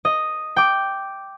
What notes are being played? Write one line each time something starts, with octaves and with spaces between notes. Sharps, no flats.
D#5
G5 D6